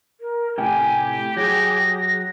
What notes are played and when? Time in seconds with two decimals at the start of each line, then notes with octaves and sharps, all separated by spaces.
0.20 A#4
0.58 A2 C3 G4 G5 G#5
1.37 F#3 G#4 A#6